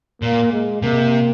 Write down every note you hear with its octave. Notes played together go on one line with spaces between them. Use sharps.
A#2 A#3
G#3
C3 A#3